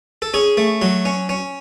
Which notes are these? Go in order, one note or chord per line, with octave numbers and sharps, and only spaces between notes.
A4
C#4 G#4
A3
F#3
C#4
C#4